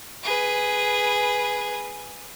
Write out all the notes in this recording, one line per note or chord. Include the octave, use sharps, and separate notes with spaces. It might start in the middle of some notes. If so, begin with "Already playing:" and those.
G#4 B4